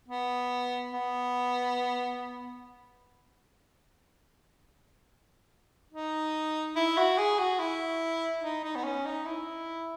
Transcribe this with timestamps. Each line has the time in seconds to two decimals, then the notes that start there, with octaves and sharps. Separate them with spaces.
0.08 B3
0.93 B3
5.93 D#4
6.76 E4
6.97 F#4
7.18 G#4
7.39 F#4
7.59 E4
8.42 D#4
8.64 D#4
8.76 B3
8.84 C#4
9.06 D#4
9.26 E4